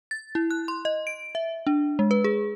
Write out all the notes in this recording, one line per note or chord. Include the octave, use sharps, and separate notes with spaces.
A6
E4
F#6
C6
D#5
D7
E5
D4
G#3
B4
G#4